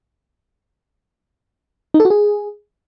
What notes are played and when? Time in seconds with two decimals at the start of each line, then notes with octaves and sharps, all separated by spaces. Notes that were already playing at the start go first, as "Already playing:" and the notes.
1.94 D#4
2.00 A4
2.05 F#4
2.10 G#4